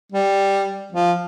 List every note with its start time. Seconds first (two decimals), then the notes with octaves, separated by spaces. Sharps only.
0.12 G3
0.93 F3